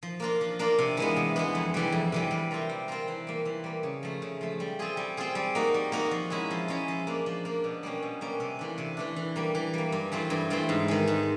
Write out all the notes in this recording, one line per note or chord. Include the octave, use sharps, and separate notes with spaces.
F3
A#3 D4 F4 A#4
F3
A#3 D4 F4 A#4
C3
E3 G#3 B3
C3
E3 G#3 B3
F2
C3 E3 G3
F2
C3 E3 G3
G3
C4 F4 A#4
G3
C4 F4 A#4
E3
G3 A#3
E3
G3 A#3
C#3
F3 A3
C#3
F3 A3
G3
C4 F4 G#4
G3
C4 F4 G#4
G3
A#3 D#4 F#4 A#4
G3
A#3 D#4 F#4 A#4
F3
G#3 C#4 E4
F3
G#3 C#4 E4
F3
A#3 D4
F3
A#3 D4
B2
G3 A#3 C#4
B2
G3 A#3 C#4
C3
E3 A3 D4
C3
E3 A3 D4
E3
G3 A#3
E3
G3 A#3
G2
E3 A3 C4 F4
G2
E3 A3 C4 F4
G#2
D#3 G#3
G#2